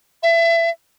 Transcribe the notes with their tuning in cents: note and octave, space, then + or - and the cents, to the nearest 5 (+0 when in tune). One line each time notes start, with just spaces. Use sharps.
E5 +25